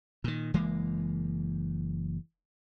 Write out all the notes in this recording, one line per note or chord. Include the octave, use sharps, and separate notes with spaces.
A#2 D#3
F#1 E3 G#3 A#3